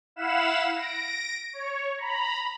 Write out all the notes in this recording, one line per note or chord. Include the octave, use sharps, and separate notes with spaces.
E4 F5 F#5 B5 E7
A#6 D7
C#5
A#5 B5